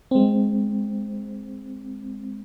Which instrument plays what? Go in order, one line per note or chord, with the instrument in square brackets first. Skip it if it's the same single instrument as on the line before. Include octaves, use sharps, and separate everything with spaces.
[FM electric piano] G#3 C4